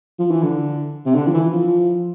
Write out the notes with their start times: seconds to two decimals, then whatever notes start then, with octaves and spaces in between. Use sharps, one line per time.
0.19 F3
0.31 E3
0.43 D3
1.06 C3
1.15 D3
1.27 F3
1.34 E3
1.52 F3